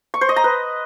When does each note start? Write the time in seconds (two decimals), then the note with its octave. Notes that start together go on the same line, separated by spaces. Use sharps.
0.14 C#6
0.21 C5
0.29 D#5
0.36 A#5
0.44 B4